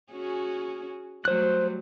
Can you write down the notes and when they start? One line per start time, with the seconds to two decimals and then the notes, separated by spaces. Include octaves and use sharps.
0.11 C#4 F#4 G#4
1.25 F#3 G3 A3 C5 F#6